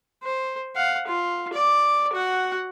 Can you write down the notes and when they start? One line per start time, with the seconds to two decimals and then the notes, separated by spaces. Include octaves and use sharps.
0.23 C5
0.76 F5 F#5
1.07 F4
1.53 D5 D6
2.13 F#4 F#5